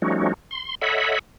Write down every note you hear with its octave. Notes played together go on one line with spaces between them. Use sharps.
F3 G3 A3 C#4 D#4 F#4
C6
A4 C#5 D#5 E5 F#5 B5